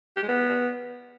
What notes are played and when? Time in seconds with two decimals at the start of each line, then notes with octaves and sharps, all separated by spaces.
0.17 G4
0.23 G#3
0.28 B3